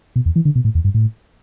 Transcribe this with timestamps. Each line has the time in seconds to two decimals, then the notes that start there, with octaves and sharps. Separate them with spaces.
0.16 B2
0.26 E2
0.36 E3
0.45 D3
0.55 B2
0.65 A2
0.75 E2
0.84 G2
0.94 A2